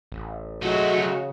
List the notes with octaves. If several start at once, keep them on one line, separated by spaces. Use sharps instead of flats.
A1
F#3 G#3 A3 D#4 F#4
C#3